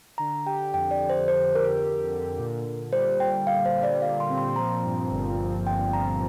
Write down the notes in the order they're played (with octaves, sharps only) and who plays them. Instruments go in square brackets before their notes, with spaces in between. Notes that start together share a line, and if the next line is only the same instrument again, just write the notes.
[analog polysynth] D3 [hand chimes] A#5
[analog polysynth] G4 [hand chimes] G5
[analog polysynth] F2 [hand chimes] G5
[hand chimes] D5
[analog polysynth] F2
[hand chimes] C5
[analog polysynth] D3 [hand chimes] C5
[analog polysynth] G4 [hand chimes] A#4
[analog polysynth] G4
D3
A#2
A#2
[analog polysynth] G3 [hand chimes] C5
[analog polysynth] A#2 [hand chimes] G5
[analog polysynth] A#2 [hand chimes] F5
[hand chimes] C5
[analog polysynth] G3
[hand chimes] D5
[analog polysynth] A#2 [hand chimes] F5
[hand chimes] C6
[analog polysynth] C4
[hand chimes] C6
[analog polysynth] F3 [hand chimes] A#5
[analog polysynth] G2
G1
G1
[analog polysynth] G1 [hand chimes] G5
[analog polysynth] F3 [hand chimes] A#5